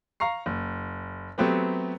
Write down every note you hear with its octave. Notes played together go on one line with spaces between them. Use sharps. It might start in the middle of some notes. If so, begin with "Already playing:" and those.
F5 A#5 C#6 C7
F#1
F#3 A3 B3 C4 G4 B4